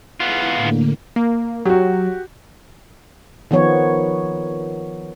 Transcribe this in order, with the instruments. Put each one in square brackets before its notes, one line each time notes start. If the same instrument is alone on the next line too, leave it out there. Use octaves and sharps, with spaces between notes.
[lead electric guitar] B3 F4 [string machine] E4 G#4
[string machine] A2 D3 A#3
[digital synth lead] A#3
[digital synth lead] F#3 [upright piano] F#4 G4
[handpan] D#3 F3 B3 C#5